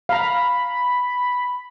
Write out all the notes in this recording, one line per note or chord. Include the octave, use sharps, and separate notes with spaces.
F5 A#5 B5